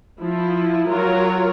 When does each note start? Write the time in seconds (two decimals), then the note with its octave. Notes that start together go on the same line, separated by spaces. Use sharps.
0.20 F3 E4
0.89 F#3 F4 A#4 C#5